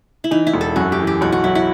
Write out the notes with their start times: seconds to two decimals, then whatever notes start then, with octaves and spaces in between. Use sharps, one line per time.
0.24 E4
0.31 E3 D#4
0.47 E4
0.54 E1
0.61 A4
0.76 F#2 F#4
0.92 G4
0.99 E3
1.07 G4
1.21 B1 F#4
1.32 F#4
1.44 F#3 E4
1.55 E4